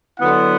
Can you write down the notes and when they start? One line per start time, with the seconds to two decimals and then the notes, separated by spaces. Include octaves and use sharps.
0.19 D3 F#3 B3 E4 F#5